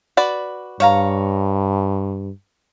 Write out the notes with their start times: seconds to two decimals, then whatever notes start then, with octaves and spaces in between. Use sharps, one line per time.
0.17 F#4 B4 D5
0.80 G2 C#5 F5 A#5